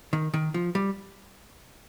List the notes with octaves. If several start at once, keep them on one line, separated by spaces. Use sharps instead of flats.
D#3
D#3
F3
G3